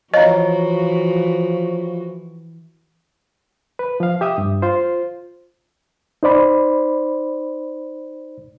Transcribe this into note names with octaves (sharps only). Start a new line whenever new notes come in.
E3 F3 F#4 C#5 D#5 F5 A#5
B4
F3 F5
G4 E5 D#6
G2
F4 C5
D#4 C5 D5 B5